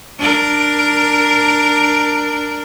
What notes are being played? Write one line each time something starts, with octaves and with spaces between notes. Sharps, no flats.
D4 A#4